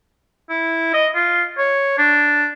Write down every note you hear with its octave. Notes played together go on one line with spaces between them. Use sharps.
E4
D#5
F4
C#5
D4